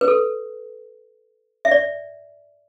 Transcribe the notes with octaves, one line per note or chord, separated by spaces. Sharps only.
B4
A4
E5
D5